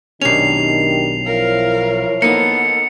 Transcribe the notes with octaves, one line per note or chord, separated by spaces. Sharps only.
B1 D#3 C#4 D4 G4 C7 F7
F3 E4 A#4 C#5 F5
A#3 B3 D#4 A4 C#7